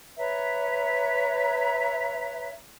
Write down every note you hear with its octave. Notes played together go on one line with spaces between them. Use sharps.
B4 C#5 E5 A#5